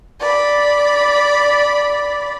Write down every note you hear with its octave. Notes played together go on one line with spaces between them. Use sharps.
D5 B5